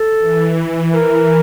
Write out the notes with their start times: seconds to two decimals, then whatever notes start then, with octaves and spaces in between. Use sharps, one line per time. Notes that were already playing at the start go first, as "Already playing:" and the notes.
Already playing: A4
0.18 E3
0.94 A#4